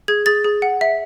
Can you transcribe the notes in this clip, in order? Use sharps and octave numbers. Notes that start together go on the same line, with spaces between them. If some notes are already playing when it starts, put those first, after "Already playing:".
G#4 G#6
G#4 A6
G#4
F#5
E5